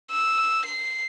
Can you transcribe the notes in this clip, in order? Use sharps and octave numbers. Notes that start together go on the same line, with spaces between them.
E6
C7